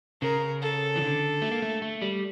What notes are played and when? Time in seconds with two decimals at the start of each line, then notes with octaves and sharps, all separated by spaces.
0.22 C#3 A#4
0.62 A4
0.96 E3
1.01 D3
1.42 A3
1.52 A#3
1.62 A3
1.82 A3
2.01 G3